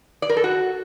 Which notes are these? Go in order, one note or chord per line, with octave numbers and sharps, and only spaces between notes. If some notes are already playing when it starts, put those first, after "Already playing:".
D5
A#4
A4
F#4